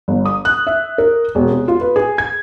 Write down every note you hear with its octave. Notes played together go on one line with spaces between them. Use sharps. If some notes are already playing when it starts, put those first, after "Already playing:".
G1
D#6
F#6
E5
A#4
E1
C3
F4
B4
G#4
G#6